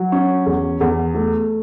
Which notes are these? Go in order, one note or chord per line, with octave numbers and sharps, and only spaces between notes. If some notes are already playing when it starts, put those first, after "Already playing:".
Already playing: F#3
C#4
E2
E2
A3